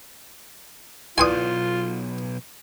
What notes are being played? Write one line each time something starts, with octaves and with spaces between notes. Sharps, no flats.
B1 E4 F4 B4 D5 G#5 C6 D#6